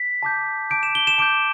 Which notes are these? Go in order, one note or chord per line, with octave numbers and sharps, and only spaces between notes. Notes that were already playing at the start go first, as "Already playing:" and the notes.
Already playing: B6
A5 D6 G6
A5 D6 G6 D7
E7
G7
E7
A5 D6 G6 D7